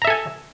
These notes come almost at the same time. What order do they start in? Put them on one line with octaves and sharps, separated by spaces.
A#5 E5 A4 G#5